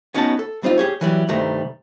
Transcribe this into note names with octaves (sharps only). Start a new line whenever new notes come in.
B3 C#4 D#4 F#4 B4 A5
A4
G3 C4 D#4 F4
G4 G#4 C#5
E3 F#3 G3
C2 G2 D#3 G3 A3 A#5